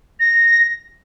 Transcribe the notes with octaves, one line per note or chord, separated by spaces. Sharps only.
A#6